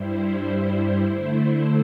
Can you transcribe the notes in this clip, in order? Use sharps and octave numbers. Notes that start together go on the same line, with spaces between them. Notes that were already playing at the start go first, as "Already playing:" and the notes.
Already playing: G2 G3 E4 C5
D3 A3 E4 C5